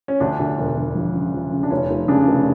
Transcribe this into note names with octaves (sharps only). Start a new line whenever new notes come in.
C#4
D2 D4
D2
E1
E1
F3
C#3
F3
C#3
D4
F1 C#4
F1
C#3 D4
F1